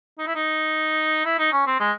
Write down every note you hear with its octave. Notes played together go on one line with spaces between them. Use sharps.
D#4
E4
D#4
E4
D#4
C#4
C4
G#3